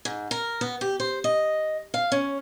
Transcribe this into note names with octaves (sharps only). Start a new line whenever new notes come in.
G#2
A#4
B3
G4
C5
D#5
F5
C#4